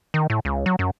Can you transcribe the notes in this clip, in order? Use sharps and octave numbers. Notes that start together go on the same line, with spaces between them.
D#3
A2
C#2
F#3
F#2